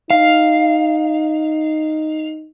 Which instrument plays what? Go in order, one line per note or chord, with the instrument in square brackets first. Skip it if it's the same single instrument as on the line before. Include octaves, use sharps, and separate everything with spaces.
[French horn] D#4 [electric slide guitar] F5